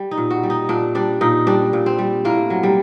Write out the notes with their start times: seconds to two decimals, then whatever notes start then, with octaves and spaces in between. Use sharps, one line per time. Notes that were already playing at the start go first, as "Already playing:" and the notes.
Already playing: G3
0.11 D#4
0.18 A#2
0.30 F#4
0.43 G3
0.50 D#4
0.69 A#2 D4
0.95 G3 D4
1.21 A#2 D#4
1.47 G3 D4
1.73 A#2
1.86 C4
1.99 G3
2.25 A2 A#3
2.50 F#3
2.63 G3